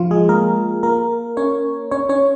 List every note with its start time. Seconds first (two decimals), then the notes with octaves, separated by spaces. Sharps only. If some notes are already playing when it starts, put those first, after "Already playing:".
Already playing: F3 F4
0.11 G#3 G#4
0.29 A#3 A#4
0.83 A#3 A#4
1.37 C#4 C#5
1.91 C#4 C#5
2.09 C#4 C#5